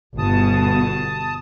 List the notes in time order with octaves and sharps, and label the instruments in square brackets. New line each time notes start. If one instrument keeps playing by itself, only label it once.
[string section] G1 B2 [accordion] A5 D#6